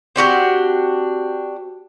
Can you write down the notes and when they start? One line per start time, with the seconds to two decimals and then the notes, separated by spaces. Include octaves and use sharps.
0.16 C4 D4 F#4 G4